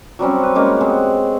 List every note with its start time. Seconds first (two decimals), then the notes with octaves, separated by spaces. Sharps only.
0.19 F#3 G3 C4 C#4
0.43 B4
0.55 G3 G#3 A#3 C#4
0.81 B3 C4 G#4